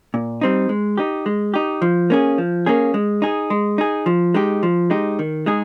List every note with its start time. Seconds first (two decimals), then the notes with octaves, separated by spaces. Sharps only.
0.14 A#2
0.41 G3 C4 D#4
0.69 G#3
0.98 D#4 G4
1.26 G#3
1.54 D#4 G4
1.82 F3
2.10 A#3 C#4 G#4
2.38 F3
2.66 A#3 C#4 G#4
2.94 G#3
3.22 D#4 G#4
3.50 G#3
3.78 D#4 G#4
4.06 F3
4.34 G#3 D#4 G4
4.63 F3
4.90 G#3 D#4 G4
5.19 D#3
5.46 G#3 D#4 G#4